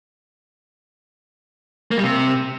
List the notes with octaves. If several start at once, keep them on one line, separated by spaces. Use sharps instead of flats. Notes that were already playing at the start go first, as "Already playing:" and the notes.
A#3
G3
C3